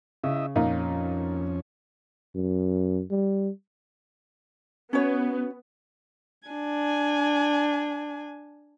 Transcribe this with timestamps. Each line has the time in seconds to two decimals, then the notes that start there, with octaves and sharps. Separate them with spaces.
0.24 C#3 E4 D#5 E5
0.56 F2 A#2 C#4 D#4
2.35 F#2
3.10 G3
4.93 B3 C#4 F#4 C#5
6.48 D4 G#5